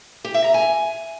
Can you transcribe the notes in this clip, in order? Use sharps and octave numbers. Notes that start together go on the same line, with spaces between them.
G4
E5
A#5
G#5